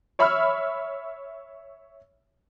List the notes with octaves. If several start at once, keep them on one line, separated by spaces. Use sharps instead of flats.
C#5 E5 B5 E6 F6